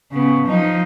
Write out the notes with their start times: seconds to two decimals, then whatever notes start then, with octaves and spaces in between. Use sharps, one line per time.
0.12 C#3 B3
0.47 F3 D#4